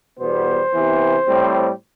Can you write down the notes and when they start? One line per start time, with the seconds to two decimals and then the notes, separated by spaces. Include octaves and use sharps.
0.20 E2 B2 G3 B3 C5
0.73 C3 E3 B3
1.27 A2 G3 C4